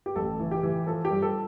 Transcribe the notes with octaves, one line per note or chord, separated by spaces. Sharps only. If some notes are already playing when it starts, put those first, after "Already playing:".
G4
A1 A4
E3
G4
E3
F3 A4
G4
G2
A4